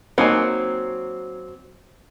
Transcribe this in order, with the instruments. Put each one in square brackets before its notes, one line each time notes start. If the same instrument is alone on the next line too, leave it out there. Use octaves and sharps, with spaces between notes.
[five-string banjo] F#3 C4 [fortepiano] A#3 D#4 G#5